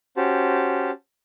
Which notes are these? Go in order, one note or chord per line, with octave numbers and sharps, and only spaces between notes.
C#4 F#4 G4 C5 A5